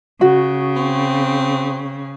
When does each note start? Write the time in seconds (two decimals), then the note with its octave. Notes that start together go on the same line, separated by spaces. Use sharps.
0.21 C#3 F#4
0.76 C4